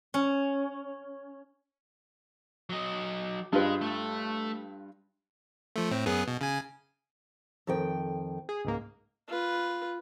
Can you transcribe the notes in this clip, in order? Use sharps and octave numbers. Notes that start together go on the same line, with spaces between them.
C#4
F#3 D#5
G2 G#3 F4 B4
A3
F3 A3
A2 C4
F#2 B3 G#4
B2
C#3 G#5
F2 D#3 G5
G#4
C#2 G#2 A#3
F4 B4